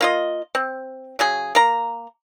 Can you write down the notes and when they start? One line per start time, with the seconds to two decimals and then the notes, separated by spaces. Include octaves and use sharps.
0.01 A#3 F4 D#5
0.55 C4
1.19 C#3 F#3 G#4
1.55 A#3 A#5